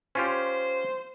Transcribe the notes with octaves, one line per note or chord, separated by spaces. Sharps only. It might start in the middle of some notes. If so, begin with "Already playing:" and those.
C#4 F4 G4 C5